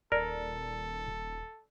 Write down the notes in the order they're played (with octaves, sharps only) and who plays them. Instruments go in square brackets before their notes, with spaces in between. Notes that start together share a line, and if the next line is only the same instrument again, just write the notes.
[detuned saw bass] D#1 [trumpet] A4 [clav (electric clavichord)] A#4 [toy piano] D5